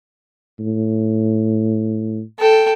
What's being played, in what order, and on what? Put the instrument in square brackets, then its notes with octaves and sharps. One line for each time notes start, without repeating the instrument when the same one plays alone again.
[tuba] A2
[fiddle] A4 G5